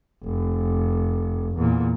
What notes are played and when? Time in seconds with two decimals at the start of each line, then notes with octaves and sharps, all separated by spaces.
0.23 F1
1.58 E2 A#2